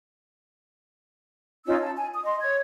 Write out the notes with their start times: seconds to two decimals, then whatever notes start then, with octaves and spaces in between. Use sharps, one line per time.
1.66 C#4 D#4 F4 E6
1.82 A5
1.97 G#5
2.13 D#6
2.25 D#5 C6
2.41 C#5 G#6